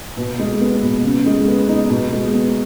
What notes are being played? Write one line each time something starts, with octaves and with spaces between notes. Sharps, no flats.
B2
G#3
B3
B2
C#3
G#3
B3
D#4
B2
G#3
B3